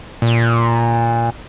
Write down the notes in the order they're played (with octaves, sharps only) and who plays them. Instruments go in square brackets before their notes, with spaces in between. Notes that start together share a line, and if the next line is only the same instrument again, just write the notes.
[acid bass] A#2